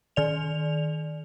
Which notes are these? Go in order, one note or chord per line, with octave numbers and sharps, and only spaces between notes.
D#3 D5 F7